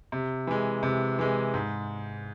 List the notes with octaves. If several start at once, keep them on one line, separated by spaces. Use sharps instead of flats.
C3
E3 G#3
C3
E3 G#3
G#2